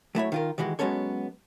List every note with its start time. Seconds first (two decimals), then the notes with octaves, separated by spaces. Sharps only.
0.15 F#3 A3 E4 C#5
0.32 D#3 F4 A#4
0.58 D#3 E3 G#3 F#4 G4
0.79 F#3 G#3 B3 C#4 A4 C#5